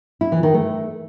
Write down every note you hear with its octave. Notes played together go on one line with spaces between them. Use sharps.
E4
E3
D#3
A3